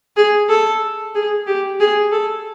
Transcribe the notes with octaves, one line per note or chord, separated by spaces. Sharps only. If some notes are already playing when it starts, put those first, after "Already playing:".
G#4
A4
G#4
G4
G#4
A4